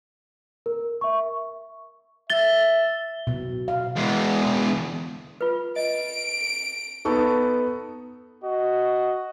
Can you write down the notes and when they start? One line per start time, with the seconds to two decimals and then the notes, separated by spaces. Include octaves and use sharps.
0.66 A#4
1.01 E5 C#6
2.30 E5 A6 G7
3.27 B2
3.68 F5
3.96 E2 G#3
5.41 F4 B4
5.76 D#5 D7
7.05 B3 D#4 A4 C#6
8.43 F#4 D#5